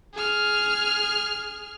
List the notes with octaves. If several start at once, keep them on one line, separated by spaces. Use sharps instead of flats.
G#4 F6